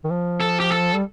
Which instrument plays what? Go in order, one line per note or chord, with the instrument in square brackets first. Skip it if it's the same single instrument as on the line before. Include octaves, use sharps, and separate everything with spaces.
[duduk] D#3
F3
[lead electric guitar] A4
G4
A4
[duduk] G3